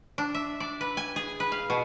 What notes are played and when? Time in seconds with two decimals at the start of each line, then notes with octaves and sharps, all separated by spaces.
0.18 D4
0.34 E5
0.60 D5
0.81 B4
0.97 G#5
1.16 G#4
1.40 B4
1.52 F5
1.70 B2